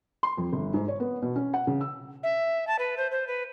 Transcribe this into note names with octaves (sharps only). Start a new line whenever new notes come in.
C6
F2
G1
G#2
C#5
B3
B2
C#4
F#5
C#3
E6
E5
A5
B4
C5
C5
B4